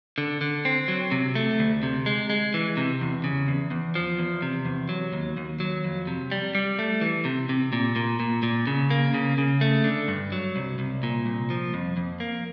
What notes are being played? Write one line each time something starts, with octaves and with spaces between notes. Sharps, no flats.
D3
D3
C4
F#3
C3
A3
D2
C3
G#3
G#3
E3
C3
E2
C#3
E2
E2
F3
E2
C3
E2
F#3
D#2
D#2
F#3
F2
C3
G3
G3
A3
E3
C3
C3
A#2
A#2
A#2
A#2
C#3
A#3
C#3
C#3
A3
D3
G2
F#3
C2
C2
A#2
C2
F3
F2
F2
A#3